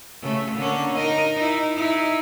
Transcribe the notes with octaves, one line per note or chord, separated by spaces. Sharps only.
C#3 A3
D3 A#3 C#4
D#4 A#4 D#5
D#4 E4
D#4 E4